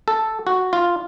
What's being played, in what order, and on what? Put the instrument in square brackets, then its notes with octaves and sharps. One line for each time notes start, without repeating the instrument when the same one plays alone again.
[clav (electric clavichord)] A4
F#4
F4